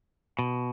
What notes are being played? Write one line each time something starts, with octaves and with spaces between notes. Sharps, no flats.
B2